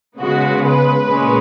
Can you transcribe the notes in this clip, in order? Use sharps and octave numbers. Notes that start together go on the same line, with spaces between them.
C#3 G#3 B3 F#4
B4
A#2 G#3 C#4